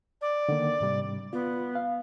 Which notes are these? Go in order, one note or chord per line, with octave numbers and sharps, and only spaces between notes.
D5
D3 D#3 A#3
G#2 C3 G3
B3 F4
F5